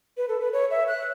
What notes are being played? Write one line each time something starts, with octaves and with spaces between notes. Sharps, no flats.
B4
A4
B4
C#5
E5
F#6